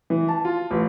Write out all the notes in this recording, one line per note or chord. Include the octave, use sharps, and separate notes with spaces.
E3
A5
F4
A1